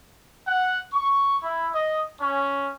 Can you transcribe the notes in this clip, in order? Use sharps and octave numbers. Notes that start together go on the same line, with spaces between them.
F#5
C#6
E4
D#5
C#4